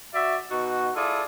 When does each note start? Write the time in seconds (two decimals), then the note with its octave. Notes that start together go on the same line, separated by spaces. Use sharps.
0.14 F#4 D5 E5
0.50 B2 D#4 F#4
0.95 E4 F4 G#4 A4 D5